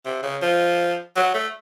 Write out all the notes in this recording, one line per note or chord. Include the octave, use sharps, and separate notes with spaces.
C3
C#3
F3
F#3
A3